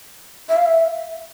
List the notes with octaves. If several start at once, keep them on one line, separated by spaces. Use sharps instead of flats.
E5
F5
E5